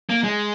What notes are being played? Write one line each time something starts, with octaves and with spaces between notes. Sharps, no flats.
A#3
G#3